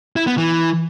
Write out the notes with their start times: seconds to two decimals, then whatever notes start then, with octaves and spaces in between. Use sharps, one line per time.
0.16 E4
0.27 B3
0.38 E3